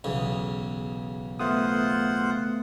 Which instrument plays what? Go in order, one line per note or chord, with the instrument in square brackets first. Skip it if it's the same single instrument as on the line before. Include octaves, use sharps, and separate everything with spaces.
[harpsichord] B1 E2 C#3
[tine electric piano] A3 B3 D#6 [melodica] F4 C5 F#5